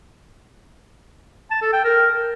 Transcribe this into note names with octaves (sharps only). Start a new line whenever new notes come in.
A5
A4
G5
A#4